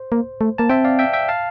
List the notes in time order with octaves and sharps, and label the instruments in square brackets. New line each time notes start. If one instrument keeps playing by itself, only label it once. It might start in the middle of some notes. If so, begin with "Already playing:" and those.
Already playing: [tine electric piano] C5
[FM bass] A#3
A3
[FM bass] A#3 [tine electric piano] A5
[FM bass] C4 [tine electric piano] E5 G5
[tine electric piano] D5 F5
E5 G5
E5 G5
F5 A5